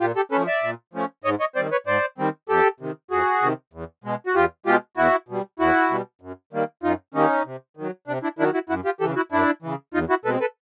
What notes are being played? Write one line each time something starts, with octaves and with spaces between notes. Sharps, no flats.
A#2 F4 G4
G4 A4
F3 A3 C#4 A4 B4
D5 E5
A#2
F3 A3 C#4
G#2 C#5 D#5
C#5 D#5
D#3 G3 C4 C5 D5
B4 C#5
G#2 C5 D5
D#3 G3 C4
F2 G4 A4
C3 D#3
F2 F#4 G#4
C3 D#3
E2
B2 G#3
F#4
E2 F4 G4
B2 G#3 F4 G4
E2 E4 F#4
B2 G3
E2 E4 F#4
B2 G3
F#2
D#3 G3 A#3
F#2 D#4 F4
D#3 G3 A#3 C#4 D#4
C3
D#3 F#3
C3 D4
D4 E4
D#3 F#3 D4 E4
E4 F#4
F#2 E4 F#4
F4 G4
C#3 E3 G4 A4
E4 F#4
F#2 D4 E4
C#3 E3
E2 D#4 F4
E4 F#4
B2 G#3 C4 A4 B4
A4 B4